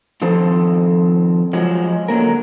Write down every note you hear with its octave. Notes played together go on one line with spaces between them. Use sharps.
D#3 F3 C4 A4 C5
F3 F#3 G#3
D3 F#3 A#3 A#4